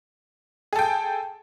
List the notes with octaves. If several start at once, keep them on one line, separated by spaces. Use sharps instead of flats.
G#4 A4 G5